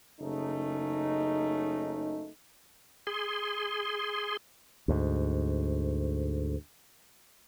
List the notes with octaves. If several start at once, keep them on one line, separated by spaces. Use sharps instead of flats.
F#1 C#3 A3 C#4 D#4
G#4 C6
D2 G#2